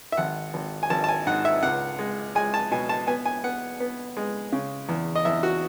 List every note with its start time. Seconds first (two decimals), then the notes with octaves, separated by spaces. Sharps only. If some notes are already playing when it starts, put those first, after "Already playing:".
0.12 E5
0.17 G#1 F#5
0.54 G#1
0.83 G#5
0.90 G#1 A5
1.04 A5
1.09 G#5
1.27 G#2 F#5
1.45 E5
1.63 C#2 F#5
1.99 G#3
2.35 G#3 G#5
2.54 A5
2.71 B2 G#5
2.89 A5
3.07 B3 G#5
3.25 G#5
3.44 B3 F#5
3.80 B3
4.17 G#3
4.52 C#3
4.89 E2
5.15 D#5
5.25 E2 E5
5.43 F#4